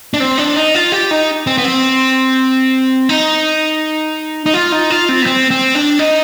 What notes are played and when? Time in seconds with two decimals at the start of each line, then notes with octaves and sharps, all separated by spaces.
0.14 D4
0.20 C4
0.38 D4
0.56 D#4
0.75 F4
0.92 G4
1.11 D#4
1.47 C4
1.58 B3
1.65 C4
3.09 D#4
4.46 D#4
4.54 F4
4.72 D#4
4.90 F4
5.09 C4
5.22 B3
5.26 C4
5.51 C4
5.75 D4
5.99 D#4